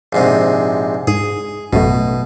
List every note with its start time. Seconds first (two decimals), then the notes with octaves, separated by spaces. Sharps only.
0.13 A#1 G#2 C3
1.07 G#2 G#4
1.73 A1 F#2 B2 A3